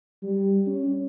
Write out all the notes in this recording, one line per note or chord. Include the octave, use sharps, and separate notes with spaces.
G3
C#4